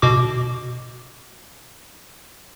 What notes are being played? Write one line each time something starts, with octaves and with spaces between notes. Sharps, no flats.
B2 F#4 D6